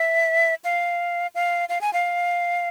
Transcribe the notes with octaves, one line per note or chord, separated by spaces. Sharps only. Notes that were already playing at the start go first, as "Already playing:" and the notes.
Already playing: E5
F5
F5
F5
G#5
F5